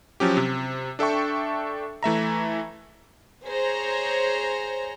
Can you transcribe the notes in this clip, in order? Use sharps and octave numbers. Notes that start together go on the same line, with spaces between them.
F3 F#3 C#4 G4
C3
D4 A4 E5 G5 C#6
E3 A3 E5 A#5
G#4 C5 C#5 A#5